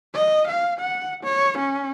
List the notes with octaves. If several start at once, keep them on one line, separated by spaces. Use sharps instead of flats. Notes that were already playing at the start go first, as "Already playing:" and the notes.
D#5
F5
F#5
C#5
C#4